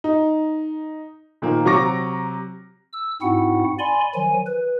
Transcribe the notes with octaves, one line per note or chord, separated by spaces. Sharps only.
D#4
A#2 D#3 F3 A#3
C3 F#3 A#5 C#6 D6 A#6
E6
G#2 C4 E4 F#4 F#5
D5 G#5 B5 C6
D#3 F3 F#3 G#5
B4